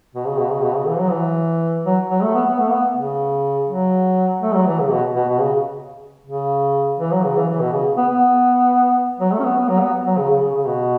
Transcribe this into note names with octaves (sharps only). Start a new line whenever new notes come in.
B2
C#3
B2
C#3
B2
C#3
E3
F#3
E3
F#3
F#3
A3
B3
B3
A3
B3
C#3
F#3
A3
F#3
E3
C#3
B2
B2
B2
C#3
C#3
E3
F#3
C#3
E3
E3
B2
C#3
B3
B3
F#3
A3
C#4
B3
B3
F#3
B3
F#3
C#3
C#3
C#3
C#3
B2